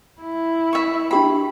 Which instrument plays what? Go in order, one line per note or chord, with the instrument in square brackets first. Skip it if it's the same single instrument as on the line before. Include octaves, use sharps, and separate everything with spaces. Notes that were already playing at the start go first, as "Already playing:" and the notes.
[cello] E4
[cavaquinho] E5 C#6
[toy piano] D4 G4 G5 [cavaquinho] B5